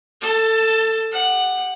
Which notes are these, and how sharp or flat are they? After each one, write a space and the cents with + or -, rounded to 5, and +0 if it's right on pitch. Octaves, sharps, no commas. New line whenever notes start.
A4 +20 A5 +0
G4 +30 F#5 +0